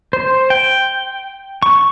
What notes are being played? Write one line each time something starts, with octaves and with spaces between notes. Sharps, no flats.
C5
G5
C#6